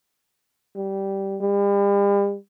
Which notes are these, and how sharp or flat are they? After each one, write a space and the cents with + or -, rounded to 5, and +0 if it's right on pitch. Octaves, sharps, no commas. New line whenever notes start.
G3 -10
G3 +40